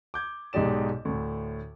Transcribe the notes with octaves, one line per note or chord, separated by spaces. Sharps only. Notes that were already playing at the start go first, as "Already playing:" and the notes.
D6 G6 G#6
B1 G#2 D#4 G4 D5 E7
D2 A2